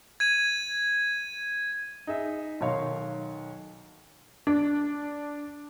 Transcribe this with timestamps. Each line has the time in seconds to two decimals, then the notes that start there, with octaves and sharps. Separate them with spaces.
0.20 G#6 D#7
2.07 D#4 G#4 E5
2.61 B1 D#3 C#5 F5 C6
4.47 D4